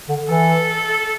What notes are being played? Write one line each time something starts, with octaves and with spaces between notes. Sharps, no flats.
D3
E3 A4